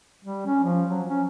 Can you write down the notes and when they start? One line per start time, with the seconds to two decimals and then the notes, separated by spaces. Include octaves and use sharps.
0.25 G3
0.46 C#4
0.64 F3
0.88 F#3
1.09 C#4